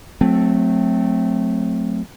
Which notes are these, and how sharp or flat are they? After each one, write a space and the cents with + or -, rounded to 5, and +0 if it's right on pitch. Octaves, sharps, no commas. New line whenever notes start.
F#3 -30 A3 +0 C4 +0